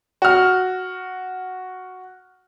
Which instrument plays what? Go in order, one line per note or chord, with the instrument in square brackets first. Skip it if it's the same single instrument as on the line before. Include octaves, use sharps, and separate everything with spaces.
[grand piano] F#4 F6